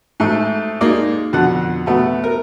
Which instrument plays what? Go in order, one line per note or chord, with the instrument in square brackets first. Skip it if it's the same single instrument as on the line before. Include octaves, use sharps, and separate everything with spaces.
[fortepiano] G#2 A3
G#3 A#3 D#4 D5
F2 B2 D3 F#5
B2 A3 B3
A#4